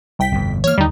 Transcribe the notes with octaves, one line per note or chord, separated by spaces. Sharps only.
C2 G5 B6
G1 F2 B2
E3 G3 A#3 C#5 F6
D#2 D3 G3 D#4